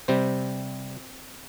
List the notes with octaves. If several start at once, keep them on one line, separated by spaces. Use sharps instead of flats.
C3 G3 C4 C5